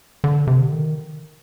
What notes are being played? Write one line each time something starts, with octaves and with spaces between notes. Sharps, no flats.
D3
C3
D3
D#3